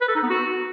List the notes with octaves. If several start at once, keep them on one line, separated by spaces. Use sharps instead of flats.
B4
A4
D#4
B3
F#4